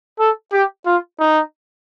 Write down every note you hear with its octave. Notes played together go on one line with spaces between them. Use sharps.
A4
G4
F4
D#4